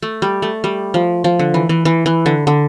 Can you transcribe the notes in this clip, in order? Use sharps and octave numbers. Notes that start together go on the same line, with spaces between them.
A3
G3
A3
G3
F3
F3
D3
E3
E3
E3
E3
D3
D3